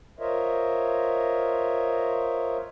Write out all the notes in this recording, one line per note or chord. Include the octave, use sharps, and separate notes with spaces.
F4 A#4 C5 C#5 D#5 E5